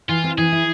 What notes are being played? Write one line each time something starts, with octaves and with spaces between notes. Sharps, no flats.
E3 F4
C4
E3 G#4
E4